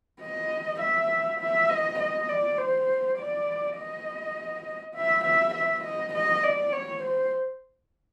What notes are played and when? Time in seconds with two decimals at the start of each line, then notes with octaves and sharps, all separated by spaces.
0.21 D#5
0.80 E5
1.40 E5
1.69 D#5
1.99 D#5
2.29 D5
2.58 C5
3.17 D5
3.77 D#5
4.95 E5
5.25 E5
5.54 E5
5.84 D#5
6.13 D#5
6.43 D5
6.72 C#5
7.02 C5